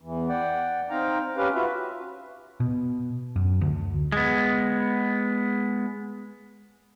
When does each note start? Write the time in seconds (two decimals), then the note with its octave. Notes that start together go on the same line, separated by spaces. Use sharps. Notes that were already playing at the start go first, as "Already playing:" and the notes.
0.02 E2 E3
0.29 D5 F#5 G5
0.90 C4 D#4 F5 G5 A#5
1.37 C#4 G4 B4 F5
1.54 F4 F#4 B4 E5
2.60 B2
3.36 F#2
3.61 D2
4.12 G#3 B3